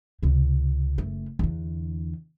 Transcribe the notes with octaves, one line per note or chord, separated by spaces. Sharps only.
C#2 C3
F#1 A3
E2 D3